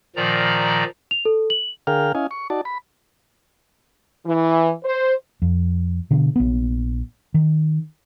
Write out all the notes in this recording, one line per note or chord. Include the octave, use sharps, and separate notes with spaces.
A#2 D#3 F3 D5 A#5
F7
A4
F#7
D3 G#4 A#4 F5 G5 F6
C#4 E4 D#5 F5 G#5
C#6
D#4 F#4 D5 A5
B5
E3
C5
F2
B2 D3
A#1 B3
D#3